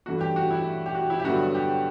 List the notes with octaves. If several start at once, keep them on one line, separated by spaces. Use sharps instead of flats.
G2 E3 A3 F#4
G4
F#4
E4
G4
F#4
E4
G4
G2 D3 F#3 B3 F#4
G4